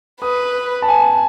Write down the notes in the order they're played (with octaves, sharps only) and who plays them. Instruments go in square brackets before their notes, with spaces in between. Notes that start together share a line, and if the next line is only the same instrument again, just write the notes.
[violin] B4 [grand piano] D#6
[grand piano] A5
G#5